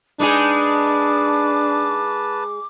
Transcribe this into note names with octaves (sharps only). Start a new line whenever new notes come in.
G#3 D4 D#4 G#4 B4 A5 D6